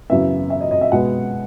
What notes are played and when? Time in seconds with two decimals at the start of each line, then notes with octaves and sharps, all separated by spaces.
0.10 F#2 C#3 E3 B3 E5
0.50 E5
0.61 D#5
0.71 D#5
0.81 E5
0.92 B2 G#3 B3 F#5